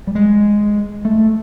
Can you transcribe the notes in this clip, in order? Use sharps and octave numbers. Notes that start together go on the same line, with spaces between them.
G3
G#3
A3